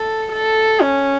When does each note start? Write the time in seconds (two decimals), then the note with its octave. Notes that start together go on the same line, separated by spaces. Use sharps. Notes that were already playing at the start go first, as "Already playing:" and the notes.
Already playing: A4
0.32 A4
0.82 C#4